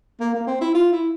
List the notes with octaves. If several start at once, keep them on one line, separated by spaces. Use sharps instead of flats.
A#3
A#3
C4
E4
F4
E4